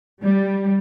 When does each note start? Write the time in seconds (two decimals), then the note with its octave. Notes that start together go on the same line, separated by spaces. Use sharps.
0.22 G3